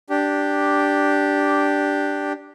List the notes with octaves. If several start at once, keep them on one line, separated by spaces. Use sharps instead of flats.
D4 G4